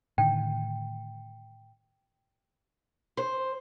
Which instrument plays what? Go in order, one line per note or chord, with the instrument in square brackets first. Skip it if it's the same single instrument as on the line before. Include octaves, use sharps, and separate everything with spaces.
[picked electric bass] A2 D3 D#3 [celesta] G5
[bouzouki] C5